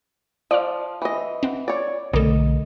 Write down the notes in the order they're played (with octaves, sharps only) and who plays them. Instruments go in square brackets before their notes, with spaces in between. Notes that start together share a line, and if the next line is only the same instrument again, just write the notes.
[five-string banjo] F3 [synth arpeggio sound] D5 F5
[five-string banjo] E3 D#5
[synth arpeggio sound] C4 F#5
[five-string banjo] C#5 D5
[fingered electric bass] B1 D3 A3 [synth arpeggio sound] A#3 A4 [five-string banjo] D#5